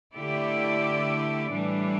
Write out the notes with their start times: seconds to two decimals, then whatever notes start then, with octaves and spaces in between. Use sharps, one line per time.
0.15 D3 A3 E4 G4 D5
1.53 A2 E3 G3 D4